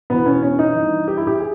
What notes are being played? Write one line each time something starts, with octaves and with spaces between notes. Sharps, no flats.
E2 B2 B3
C#4
C#4
D#4
G2 E3
G4
E4
G4
G#4